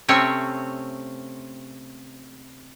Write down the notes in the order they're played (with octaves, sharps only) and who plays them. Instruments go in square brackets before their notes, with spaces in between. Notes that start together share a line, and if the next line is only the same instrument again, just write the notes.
[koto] C3 A3 C4 C#4 C#5